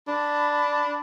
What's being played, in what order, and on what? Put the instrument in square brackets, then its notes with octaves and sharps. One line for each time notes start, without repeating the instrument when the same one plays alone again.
[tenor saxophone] D4 [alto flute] B5